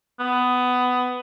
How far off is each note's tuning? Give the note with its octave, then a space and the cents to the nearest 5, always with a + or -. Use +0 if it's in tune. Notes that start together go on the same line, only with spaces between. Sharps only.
B3 +15